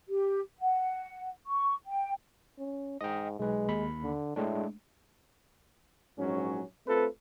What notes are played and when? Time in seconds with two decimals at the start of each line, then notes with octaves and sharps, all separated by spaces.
0.09 G4
0.60 F#5
1.47 C#6
1.87 G5
2.59 C#4
3.01 G#2 D#5 G5
3.39 B1 G#3 B4
3.68 D#2 B5
4.03 D3
4.36 A2 G#3 A3 D4
6.18 A#1 G#2 F#3 C#4
6.86 A3 C4 F4 A4 B4